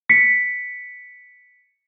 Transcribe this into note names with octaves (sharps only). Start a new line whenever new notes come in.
B6 C#7